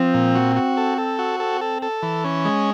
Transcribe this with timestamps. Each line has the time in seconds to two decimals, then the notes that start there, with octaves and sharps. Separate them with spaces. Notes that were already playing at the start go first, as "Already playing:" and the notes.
Already playing: F3 C4
0.14 A#2
0.35 F#4
0.56 F#4
0.77 A4
0.98 A4
1.19 F#4
1.40 A4
1.61 A4
1.82 A4
2.03 E3
2.24 C#4
2.45 G#3